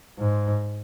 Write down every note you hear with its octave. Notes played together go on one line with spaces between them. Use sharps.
G#2